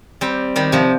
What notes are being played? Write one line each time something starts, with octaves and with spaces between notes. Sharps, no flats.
G3 C4
D#3 G3
C3 F3